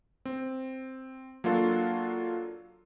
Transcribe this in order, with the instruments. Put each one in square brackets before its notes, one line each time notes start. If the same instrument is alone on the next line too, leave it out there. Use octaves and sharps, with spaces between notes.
[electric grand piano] C4
F#3 A#3 D4 F4 F#4 A4